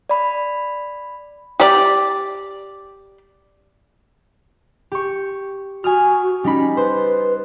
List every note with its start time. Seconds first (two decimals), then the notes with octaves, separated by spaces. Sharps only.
0.10 D5 B5
1.60 G4 D5
4.92 G4 C#6
5.84 F#4 G#5 D#6 F6
6.44 G3 C#4 D#4 B5
6.77 B4 C5